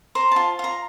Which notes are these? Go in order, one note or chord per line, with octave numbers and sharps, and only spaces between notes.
C5 A#5
F4 A5
F4 A#5